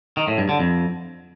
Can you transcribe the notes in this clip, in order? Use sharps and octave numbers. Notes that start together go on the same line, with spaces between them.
D#3
A2
G2
D3
F2